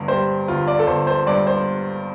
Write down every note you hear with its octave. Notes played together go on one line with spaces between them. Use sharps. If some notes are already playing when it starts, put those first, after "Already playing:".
Already playing: G1 G2
G3 C5
G1 F4
D5
A4
G1 C5
C5
G2 D5
C5